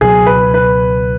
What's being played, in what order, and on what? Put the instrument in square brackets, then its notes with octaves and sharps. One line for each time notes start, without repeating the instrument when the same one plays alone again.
[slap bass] C#2 B2 F#3 [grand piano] G#4
[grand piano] B4
B4